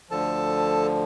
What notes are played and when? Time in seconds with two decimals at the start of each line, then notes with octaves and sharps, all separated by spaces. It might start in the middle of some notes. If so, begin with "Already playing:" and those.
0.10 D2 D3 F3 A4 A5